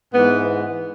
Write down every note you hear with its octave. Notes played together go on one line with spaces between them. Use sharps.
G#2 E3 B3